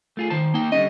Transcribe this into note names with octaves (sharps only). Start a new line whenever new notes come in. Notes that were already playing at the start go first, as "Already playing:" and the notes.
A3 F4 G#4
D#3 C5 A5
A#3 D#4 G5
D3 G3 C#4 D#5